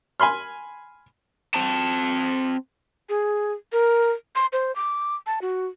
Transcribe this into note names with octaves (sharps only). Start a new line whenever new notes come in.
G#5 B5 C6 F6
C4 C5 A5
G#4
A#4
C6
C5
D6
A5
F#4